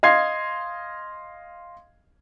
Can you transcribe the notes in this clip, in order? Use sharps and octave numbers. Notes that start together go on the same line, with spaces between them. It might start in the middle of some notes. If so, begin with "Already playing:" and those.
D#5 F5 C6 G#6 C7